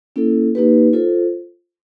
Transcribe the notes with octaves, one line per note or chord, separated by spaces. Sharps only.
A#3 C#4 E4 A4
A#3 D#4 G4 B4
F4 A4 C5